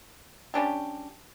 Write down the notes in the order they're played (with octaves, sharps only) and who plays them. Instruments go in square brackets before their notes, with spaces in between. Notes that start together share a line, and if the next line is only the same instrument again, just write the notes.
[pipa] G3 C#4 D4 G4